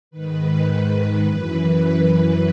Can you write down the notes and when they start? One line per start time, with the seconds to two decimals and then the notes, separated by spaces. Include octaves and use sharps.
0.11 G#2 D#3 B4
1.24 F#2 E3 B4
1.82 B4